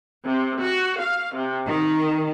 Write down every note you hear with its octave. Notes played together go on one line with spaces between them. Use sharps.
C3
F#4
F5
C3
D#3